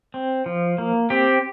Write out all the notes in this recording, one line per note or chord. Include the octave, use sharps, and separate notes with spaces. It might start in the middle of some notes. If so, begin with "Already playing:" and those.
C4
F3
A#3
C4 G4